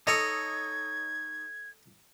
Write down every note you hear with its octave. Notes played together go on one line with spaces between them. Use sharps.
D#4 A4 C#5 D#5 G#6